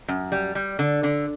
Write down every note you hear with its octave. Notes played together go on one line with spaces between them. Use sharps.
F#2
G3
G3
D3
D3